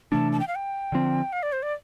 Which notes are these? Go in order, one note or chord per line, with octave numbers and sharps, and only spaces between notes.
C3 E3 A3 D4 A5
A5
G5
F5
G5
D3 F3 C4
F5
D5
C5
D5